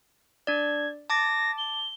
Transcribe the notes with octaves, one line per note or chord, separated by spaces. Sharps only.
D4 D5 G#6
A5 D6 A6 A#6
G7